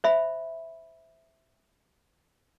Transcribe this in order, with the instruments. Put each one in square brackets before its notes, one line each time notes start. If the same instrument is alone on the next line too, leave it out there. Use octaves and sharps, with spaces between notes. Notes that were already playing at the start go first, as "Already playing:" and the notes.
[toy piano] C5 E5 B5